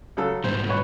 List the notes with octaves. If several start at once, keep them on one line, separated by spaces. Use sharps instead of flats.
C#3 F#3 A4
G#2 B2 G3 C5
B4 C#5